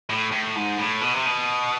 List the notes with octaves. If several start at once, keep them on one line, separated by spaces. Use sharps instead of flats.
A2
A2
G#2
A2
B2
C3
B2